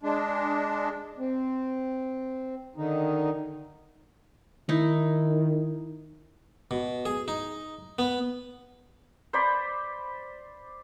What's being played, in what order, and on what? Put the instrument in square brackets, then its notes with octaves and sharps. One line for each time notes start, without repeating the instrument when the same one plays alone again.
[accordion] G#3 D4
[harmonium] C4
D3 D#3 D#4
[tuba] D#3 [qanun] D#4 E4
[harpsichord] B2
G#4
D#4
B3
[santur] C5 D5 B5